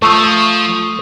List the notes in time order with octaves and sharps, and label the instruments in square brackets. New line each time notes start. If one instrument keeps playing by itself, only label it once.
[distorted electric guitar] F3 [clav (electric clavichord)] A3 [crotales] C#6 D#6